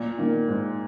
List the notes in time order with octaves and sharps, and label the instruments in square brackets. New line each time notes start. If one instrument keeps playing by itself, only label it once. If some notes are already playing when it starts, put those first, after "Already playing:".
Already playing: [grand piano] A#2
[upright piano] D#3 A#3
G#2